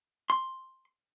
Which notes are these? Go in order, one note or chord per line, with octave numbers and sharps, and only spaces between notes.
C6